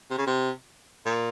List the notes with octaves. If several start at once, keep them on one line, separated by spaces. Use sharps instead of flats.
C3
C#3
C3
A#2